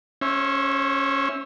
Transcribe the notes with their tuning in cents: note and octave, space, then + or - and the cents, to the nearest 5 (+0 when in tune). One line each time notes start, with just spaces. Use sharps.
C#4 +0 C5 +40 E5 +0